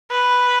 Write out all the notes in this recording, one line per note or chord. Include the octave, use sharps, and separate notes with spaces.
B4